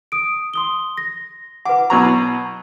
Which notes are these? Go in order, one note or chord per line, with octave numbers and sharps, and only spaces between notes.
D#6 D7
C6 D#6 G7
A#6
B4 F#5 D6
B2 F#3 A#5 C#6